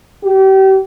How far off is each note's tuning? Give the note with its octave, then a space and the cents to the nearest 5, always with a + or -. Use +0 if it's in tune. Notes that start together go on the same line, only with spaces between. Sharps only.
G4 -35